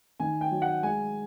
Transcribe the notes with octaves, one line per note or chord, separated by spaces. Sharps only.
D#3 G#5
G5
F#3
F#5
G#3 G#5